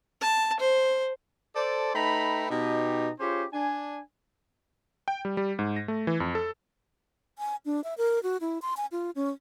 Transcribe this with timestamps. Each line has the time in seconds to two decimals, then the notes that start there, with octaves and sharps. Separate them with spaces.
0.21 A5
0.59 C5
1.56 A4 C5 D5
1.95 A3 D#4 B4 G5 A#5 B5
2.50 B2 D#4 G4
3.19 C#4 F4 G4 G#4 C5 C#5
3.53 D4 G#5
5.08 G5
5.25 G3
5.37 G3
5.59 G#2
5.76 A#6
5.88 A3
6.07 E3
6.20 F2
6.35 A4
7.39 G#5
7.66 D4
7.84 E5
7.98 A#4
8.23 F#4
8.41 E4
8.62 C6
8.77 G#5
8.92 F4
9.15 C#4